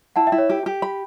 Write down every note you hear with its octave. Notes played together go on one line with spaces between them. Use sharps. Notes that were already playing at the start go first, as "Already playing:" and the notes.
E4 F#5 A5
E5 G5
E4
C#5 E5
G4
G4
B5